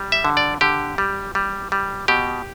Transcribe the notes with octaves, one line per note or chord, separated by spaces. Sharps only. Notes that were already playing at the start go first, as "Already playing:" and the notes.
Already playing: G3
E5
D3
D5
D3 G4
G3
G3
G3
B2 G4